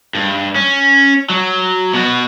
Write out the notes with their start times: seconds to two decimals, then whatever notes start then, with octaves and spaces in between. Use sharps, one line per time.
0.15 G2
0.56 C#4
1.30 F#3
1.93 B2 F#4